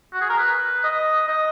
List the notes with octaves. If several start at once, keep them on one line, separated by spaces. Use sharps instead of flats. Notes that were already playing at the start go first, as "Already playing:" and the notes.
F#4
G#4
A#4
B4
D#5
D#5